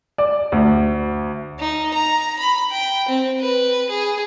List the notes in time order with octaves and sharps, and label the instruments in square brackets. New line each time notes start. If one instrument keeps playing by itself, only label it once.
[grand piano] D5
D2
[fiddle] D#4
A#5
B5
G5
C4
B4
G#4